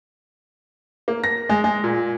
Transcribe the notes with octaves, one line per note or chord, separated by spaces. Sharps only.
A#3
A#6
G#3
G#3
A#2